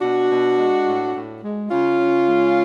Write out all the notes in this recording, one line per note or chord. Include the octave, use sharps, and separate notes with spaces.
B2 D4 F#4
B2
G#3
A2
A2
G#3
C#3 C#4 F4
C#3
G#3